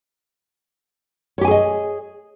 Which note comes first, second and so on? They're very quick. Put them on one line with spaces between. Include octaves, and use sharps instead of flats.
C#5 G4 G#5 G#4 D#5